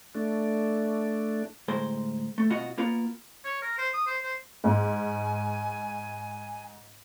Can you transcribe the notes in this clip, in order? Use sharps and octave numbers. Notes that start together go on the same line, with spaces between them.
A3 D4
D2 A2 G#3 A#4 C5
A3
C2 B2 F4 F#4 D#5 F#5
A#3 B3 F4 A#4
C#5
A#4
C5
D#6
C5
C5
G#2 G#5